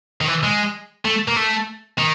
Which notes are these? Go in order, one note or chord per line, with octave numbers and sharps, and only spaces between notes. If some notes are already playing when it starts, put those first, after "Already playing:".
D#3
E3
G#3
A3
A#3
A3
D#3